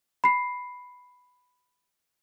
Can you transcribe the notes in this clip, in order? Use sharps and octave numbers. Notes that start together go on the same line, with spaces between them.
B5 C7